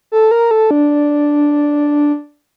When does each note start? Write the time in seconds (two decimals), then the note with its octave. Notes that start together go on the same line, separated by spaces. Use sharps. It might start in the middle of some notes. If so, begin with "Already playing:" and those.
0.12 A4
0.31 A#4
0.51 A4
0.71 D4